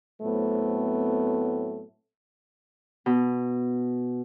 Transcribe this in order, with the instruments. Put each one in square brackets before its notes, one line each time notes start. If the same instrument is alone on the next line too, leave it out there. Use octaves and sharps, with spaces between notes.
[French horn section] A2 F#3 A3 B3 C4
[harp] B2